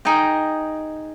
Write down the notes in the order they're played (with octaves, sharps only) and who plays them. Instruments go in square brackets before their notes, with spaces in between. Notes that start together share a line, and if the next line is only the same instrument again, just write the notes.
[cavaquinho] D#4 G#4 D#5 G5